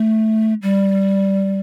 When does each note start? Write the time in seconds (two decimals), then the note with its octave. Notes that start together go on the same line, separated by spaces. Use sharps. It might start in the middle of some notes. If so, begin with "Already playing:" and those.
Already playing: A3
0.62 G3